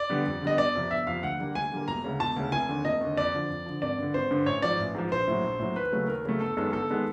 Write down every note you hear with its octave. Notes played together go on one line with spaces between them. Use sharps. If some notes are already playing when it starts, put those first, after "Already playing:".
Already playing: D5
D3 G3 B3
F2
D3 G3 B3 D#5
G1 D5
F2 C3 F3
G1 E5
F2 C3 F3 F5
D2 F#5
D3 G3 A#3
D2 G#5
D3 G3 A#3
E1 A#5
D2 C#3
E1 A5
D2 C#3
F1 G#5
D#2 D3
F1 D#5
D#2 D3
F2 D5
D3 F3
F2
D3 F3
G#1 D5
G2 D3
G#1 C5
G2 D3
A1 C#5
G#2 F3 D5
A1
G#2 F3
A#1 C5
A2 F#3
A#1
A2 F#3
D#2 B4
C#3 F#3 A3
D#2 A#4
C#3 F#3 A3
G1 A4
F#2 D#3 G#3 B3 A4
G1 A4
D#3 G#3 B3